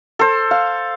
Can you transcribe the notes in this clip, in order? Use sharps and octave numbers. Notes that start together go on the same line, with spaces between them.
A4 C5
F5